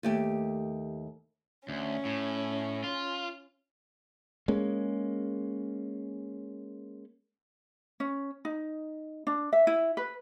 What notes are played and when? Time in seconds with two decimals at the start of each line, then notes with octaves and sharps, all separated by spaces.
0.03 D#2 A3 G4
1.68 D2 C#4
2.05 A2
2.84 F4
4.48 G#3 A#3 C#4
8.00 C#4
8.45 D#4
9.27 D4
9.53 E5
9.67 E4
9.97 B4